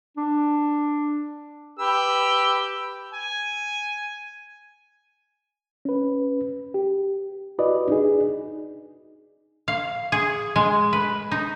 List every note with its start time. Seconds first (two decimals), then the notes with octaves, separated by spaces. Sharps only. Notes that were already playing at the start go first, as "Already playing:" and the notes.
0.17 D4
1.79 G4 B4 E6
3.14 G#5
5.85 C#4 B4
6.74 G4
7.59 E4 F#4 B4 D5 D#5
7.88 D4 D#4 G#4
9.68 F5
10.12 G#4
10.56 G#3
10.93 B4
11.32 D#4